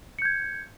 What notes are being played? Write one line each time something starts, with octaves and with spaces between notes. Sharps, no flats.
G6 G#6 C#7